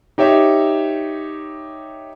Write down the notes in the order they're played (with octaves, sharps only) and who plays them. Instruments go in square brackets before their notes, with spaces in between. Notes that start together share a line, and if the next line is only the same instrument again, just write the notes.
[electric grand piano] D#4 G4 C#5 E5